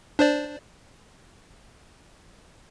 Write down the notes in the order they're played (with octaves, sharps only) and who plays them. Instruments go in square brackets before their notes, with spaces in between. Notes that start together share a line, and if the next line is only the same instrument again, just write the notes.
[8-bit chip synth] D4 C5 D5